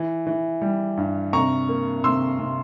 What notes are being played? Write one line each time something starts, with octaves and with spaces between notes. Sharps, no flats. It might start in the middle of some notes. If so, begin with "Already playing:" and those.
Already playing: E3
E3
G3
G2
C3 A#5 C#6
A#3
C3 C6 E6
C3